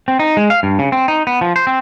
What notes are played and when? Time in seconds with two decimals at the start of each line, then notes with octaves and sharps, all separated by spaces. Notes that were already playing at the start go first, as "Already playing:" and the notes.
0.08 C4
0.19 D#4
0.37 G#3
0.50 F5
0.63 G2
0.79 C#3
0.92 C4
1.08 D#4
1.27 B3
1.41 F3
1.56 C5
1.67 C4